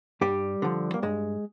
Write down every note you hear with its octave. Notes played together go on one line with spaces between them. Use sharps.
G2 G3 G4
D3 F3
A#3
G2 G#3